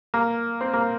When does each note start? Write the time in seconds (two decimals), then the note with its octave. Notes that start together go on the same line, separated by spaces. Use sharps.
0.14 A#3
0.61 C4
0.73 A#3